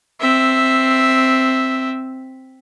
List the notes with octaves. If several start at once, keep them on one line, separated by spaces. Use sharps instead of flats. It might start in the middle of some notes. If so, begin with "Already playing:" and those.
C4 E5